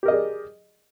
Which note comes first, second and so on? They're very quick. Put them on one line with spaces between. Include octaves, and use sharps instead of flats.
G4 A#4 D#5 G#4 D5